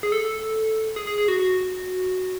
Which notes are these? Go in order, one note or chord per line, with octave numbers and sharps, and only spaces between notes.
G#4
A4
G#4
G#4
G#4
F#4
F#4